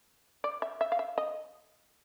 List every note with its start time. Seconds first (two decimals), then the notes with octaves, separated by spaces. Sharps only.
0.44 D5
0.62 E5
0.81 E5
0.92 F5
0.99 E5
1.18 D#5